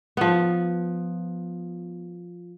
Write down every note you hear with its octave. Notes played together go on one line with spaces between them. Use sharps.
F3 B3